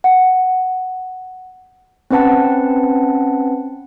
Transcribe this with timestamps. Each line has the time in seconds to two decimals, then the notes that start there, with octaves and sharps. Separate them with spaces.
0.04 F#5
2.11 C4 C#4 B4 F#5 A5